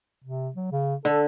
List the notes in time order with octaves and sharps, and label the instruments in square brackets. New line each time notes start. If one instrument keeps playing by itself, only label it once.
[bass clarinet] C3
F#3
C#3
[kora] D3 [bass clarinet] A4